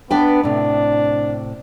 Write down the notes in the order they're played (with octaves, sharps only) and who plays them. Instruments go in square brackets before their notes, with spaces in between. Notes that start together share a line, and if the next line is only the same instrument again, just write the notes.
[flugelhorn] B3 [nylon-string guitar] D4 B4 G5
[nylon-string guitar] A2 C3 [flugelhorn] D4